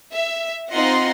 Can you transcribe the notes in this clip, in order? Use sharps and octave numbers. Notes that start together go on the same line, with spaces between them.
E5
C4 D#4 F4 D#5 F#5 C6